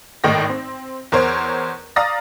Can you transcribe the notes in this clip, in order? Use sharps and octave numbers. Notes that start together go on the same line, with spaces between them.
G#1 A2 D#3 G5 A#6
C4
E2 A#4 C5 C#5 D7
D5 F5 A#5 D#6 A6 A#6